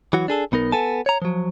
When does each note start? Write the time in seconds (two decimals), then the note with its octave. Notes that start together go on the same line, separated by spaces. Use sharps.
0.13 E3 F#3 F#4
0.28 D4 G#4 A4
0.52 B1 B3 D#4 A#4
0.72 B3 A4 G#5 A5
1.06 C#5 A#5
1.22 F3 F#3